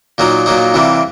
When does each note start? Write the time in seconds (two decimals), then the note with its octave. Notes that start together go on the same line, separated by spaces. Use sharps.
0.18 A#2 F#3 A#3 D#4
0.46 A#2 F#3 A#3 D#4
0.74 C3 E3 G3 A#3